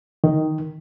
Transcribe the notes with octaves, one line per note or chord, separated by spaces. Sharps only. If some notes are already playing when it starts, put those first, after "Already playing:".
D#3